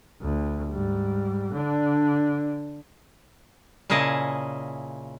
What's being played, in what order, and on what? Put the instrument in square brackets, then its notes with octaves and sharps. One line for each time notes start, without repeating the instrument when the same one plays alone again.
[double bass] D2
G#2 G3
D3 D4
[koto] A#2 C#3 E4 G#4 D#5 A5